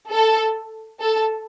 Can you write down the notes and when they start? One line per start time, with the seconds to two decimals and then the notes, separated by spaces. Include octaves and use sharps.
0.11 A4
1.01 A4